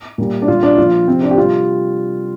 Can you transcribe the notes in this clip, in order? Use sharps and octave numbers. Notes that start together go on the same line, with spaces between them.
A#2 G3
D4
A#2 G3 F4
D4
A#2 F3 F4
C3 F3 C4
D4
G4
C3 G3 F4